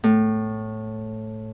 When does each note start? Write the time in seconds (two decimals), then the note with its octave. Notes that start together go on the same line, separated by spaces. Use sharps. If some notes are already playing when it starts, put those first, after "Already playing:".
0.04 A2